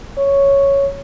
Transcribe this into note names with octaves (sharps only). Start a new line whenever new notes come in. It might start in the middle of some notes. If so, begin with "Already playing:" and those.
C#5